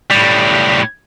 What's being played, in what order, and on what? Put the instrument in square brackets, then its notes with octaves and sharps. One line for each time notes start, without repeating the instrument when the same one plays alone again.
[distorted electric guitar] A2 G3